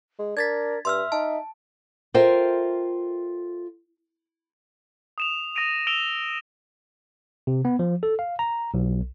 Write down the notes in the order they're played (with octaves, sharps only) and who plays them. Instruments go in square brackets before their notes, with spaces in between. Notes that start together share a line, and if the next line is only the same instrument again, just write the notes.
[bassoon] G#3
[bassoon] D4 [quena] A#4 [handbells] G#6 A6 B6
[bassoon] G2 [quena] E5 [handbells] C6 E6 F6
[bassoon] D#4 [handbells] A5
[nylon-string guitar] F4 A4 A#4 C5 E5 G5
[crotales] D#6 E7 F7
D#6 A#6 D7 D#7 F7
D#6 E6 D7 E7 F7 G7
[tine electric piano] C3
B3
F3
A4
F5
A#5
B1